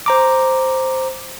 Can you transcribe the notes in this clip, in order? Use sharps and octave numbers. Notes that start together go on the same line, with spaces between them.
C5 A#5 D6